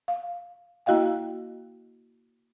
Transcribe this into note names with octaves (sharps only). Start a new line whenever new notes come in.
F5
A#3 E4 F#4 D#5 F5 G5